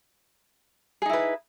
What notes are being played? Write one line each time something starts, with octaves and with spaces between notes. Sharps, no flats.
D#4 E4 G#4 B4